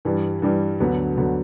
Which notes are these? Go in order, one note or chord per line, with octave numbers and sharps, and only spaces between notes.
G2 E3 G3
G2 E3 G3
D2 D3 F#3 B3
D2 D3 F#3 B3